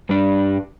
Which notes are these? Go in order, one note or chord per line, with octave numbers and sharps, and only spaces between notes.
G2 G3 D4